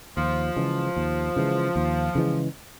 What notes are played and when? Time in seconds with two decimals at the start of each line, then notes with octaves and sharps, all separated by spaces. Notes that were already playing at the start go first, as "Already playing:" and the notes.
0.17 D#2 F3
0.56 C#3 E3 G#3
0.96 D#2
1.36 C#3 E3 G#3
1.76 D#2
2.15 C#3 E3 G#3